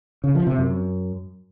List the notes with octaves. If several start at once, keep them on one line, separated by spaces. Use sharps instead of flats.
C#3
F3
C3
F#2